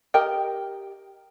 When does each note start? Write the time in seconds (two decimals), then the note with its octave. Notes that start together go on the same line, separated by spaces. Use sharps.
0.14 G4 A#4 D#5 G5